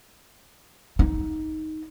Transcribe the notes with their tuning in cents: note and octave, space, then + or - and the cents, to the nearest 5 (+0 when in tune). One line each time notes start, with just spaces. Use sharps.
D#4 +10